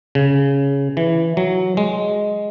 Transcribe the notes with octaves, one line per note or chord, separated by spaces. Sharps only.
C#3
E3
F#3
G#3